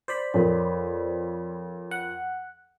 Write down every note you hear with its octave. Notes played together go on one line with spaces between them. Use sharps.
C5 D5 B5
F2 A#4 C#5
F#5